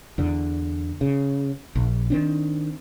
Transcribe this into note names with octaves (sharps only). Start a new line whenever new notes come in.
E2 D3
C#3
A#1
D#3 C4 D4